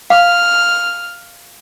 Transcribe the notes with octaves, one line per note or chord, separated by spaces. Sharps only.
F5 F6